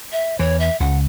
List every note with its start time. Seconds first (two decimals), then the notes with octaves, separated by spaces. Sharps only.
0.12 E5
0.39 E2 E3 C#5
0.60 E5
0.80 C#2 C#3 F#5